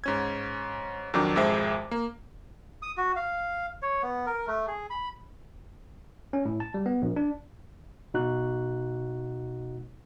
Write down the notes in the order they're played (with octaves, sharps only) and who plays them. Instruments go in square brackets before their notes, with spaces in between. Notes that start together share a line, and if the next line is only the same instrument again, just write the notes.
[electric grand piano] G#2 C#4 G#6
F2 D#3 F#3 D4 D6
G#1 F2 G#3 C5 E5
A#3
[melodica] D#6
F#4
F5
C#5
B3
A#4
A3
G#4
B5
[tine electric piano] C#4
A2
A5
G3
B3
A#1
D4
B2 D#4 F#4 F#6